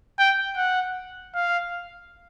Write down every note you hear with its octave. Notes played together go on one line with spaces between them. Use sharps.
G5
F#5
F5